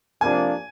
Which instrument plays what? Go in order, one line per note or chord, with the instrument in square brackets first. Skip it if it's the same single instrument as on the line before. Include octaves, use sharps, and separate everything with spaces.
[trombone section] F2 C3 F3 A#3 D4 [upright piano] G#5